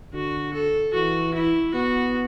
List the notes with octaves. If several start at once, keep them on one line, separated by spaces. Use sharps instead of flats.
D3 F#4
A4
E3 F#4
E4
B3 F#4